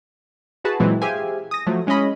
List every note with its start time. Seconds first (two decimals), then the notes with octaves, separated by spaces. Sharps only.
0.64 E4 F#4 G#4 B4 A5 B5
0.80 A#2 E3 F#3 G#3 C4
1.02 G4 G#4 C5 E5 F5 G#5
1.51 D#6 A#6
1.67 F3 F#3 A3
1.87 G#3 C#4 E4 D#5 B5